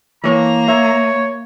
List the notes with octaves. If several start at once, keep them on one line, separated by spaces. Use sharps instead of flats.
E3 A#3 C#5 A#5
C#5 E5